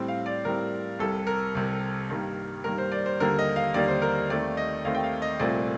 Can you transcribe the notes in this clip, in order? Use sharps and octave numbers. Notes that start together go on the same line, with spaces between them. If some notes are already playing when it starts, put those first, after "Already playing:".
Already playing: A2 G3 C4
F5
D5
A2 G3 C4 A#4
C2 C3 G3 A4
A#4
C2 C3 G3
G2 D#3 G3 A#3
G2 D#3 G3 A#3 A#4
C5
D5
C5
D#2 D3 G3 A#3 A#4
D#5
F5
D#2 D3 G3 A#3 D5
C5
A#4
D#2 D#3 A3 C4 D5
D#5
D#2 D#3 A3 C4 F5
G5
F5
D#5
C2 A#2 A3 C4 D5